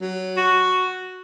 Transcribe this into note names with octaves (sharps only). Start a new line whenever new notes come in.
F#3
F#4